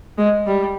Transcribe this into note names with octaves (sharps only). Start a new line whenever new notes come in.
G#3
G3